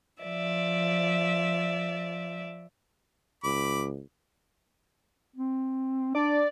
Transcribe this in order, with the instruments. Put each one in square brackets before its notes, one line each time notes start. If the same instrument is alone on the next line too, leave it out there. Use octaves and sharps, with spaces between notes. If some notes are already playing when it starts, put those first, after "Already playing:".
[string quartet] F3 D5 E5
[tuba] C#2 [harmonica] B5 D6
[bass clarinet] C4
[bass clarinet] D4 [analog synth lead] D5